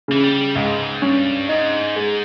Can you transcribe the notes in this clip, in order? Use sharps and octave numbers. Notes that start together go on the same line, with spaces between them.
C#3 E3
G3
C#2 G#2
G2 C#4
G#2 D#4
G#3